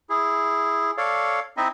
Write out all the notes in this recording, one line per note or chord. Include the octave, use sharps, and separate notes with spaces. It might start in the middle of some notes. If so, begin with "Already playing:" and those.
E4 G#4
A4 C#5 D5 F5
C4 D#4 E4 D#5 E5